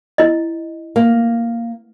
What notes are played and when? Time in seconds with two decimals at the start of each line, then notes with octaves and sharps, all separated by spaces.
0.18 E4 D#5
0.96 A#3